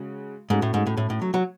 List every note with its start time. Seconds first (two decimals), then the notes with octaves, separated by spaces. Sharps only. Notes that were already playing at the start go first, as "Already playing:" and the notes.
Already playing: C#3 G#3 F#4
0.50 G#2 A3 C#4 F#4
0.62 A2
0.74 G#2
0.87 A2
0.97 A2
1.10 A2
1.22 F#3
1.34 F#3